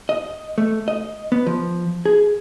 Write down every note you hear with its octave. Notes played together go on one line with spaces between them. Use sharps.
D#5
A3
D#5
B3
F3
G#4